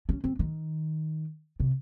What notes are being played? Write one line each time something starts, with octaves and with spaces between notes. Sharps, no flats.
C#4
C4
D#3
C3